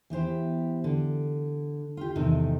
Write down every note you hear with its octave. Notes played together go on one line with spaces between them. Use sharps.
E3 B3 G4 C5
D3
F4 G4
E2 G#2 C3 D#3 D#4 A4